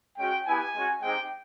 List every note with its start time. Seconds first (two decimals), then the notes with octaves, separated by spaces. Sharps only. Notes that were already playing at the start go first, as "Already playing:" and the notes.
0.18 G#3 C#4 F#4 G5
0.46 B3 E4 G4 G#5
0.74 G#3 C#4 F#4
1.02 G#3 C4 D#4 G4 G5